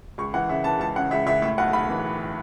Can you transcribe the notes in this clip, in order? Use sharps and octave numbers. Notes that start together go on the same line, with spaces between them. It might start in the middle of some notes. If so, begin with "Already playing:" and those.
C#2 C#6
E3 F#5
C#3 E5
E3 A5
C#2 A5
C#3 F#5
C#2 E5
C#2 E5
A2 E5
B1 F#5
B1 B5
E3